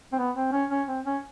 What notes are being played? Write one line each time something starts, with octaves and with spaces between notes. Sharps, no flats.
C4
B3
C4
C#4
C#4
C4
C#4